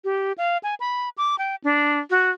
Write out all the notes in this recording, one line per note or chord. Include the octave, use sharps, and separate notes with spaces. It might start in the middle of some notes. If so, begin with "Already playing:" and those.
G4
F5
G#5
B5
D6
G5
D4
F#4